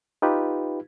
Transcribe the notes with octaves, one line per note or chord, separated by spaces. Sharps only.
D#4 F4 G4 B4